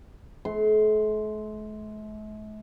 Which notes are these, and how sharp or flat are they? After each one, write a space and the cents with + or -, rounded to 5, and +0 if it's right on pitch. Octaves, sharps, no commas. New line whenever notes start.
A3 -45 C6 +0